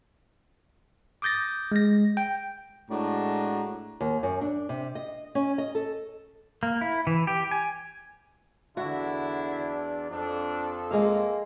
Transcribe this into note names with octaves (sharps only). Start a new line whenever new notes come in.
D6 D#6 G6 A6 A#6
G#3 A#6
G5
A2 G#3 D4 F#4 A#5
D#2
F#2
D4
C3
D#5
C#4
D#5
A4
A#3
E4
E3
G4
G#5
E2 D3 D4 E4 F#4
F2 D4 A4
G#3 A#3 F5